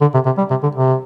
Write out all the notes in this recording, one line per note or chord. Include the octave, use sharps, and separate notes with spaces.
D3
C3
C3
G3
C3
D3
C3